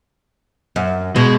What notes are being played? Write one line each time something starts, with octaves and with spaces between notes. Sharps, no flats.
F#2
B2 G#3